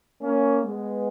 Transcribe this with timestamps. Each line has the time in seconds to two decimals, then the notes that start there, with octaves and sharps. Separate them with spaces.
0.21 A#3 C#4
0.61 G#3 B3